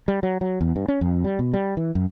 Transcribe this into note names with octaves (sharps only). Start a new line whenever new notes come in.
G3
F#3
F#3
E2
G2
C#4
F2
G3
B2
G3
E3
F#2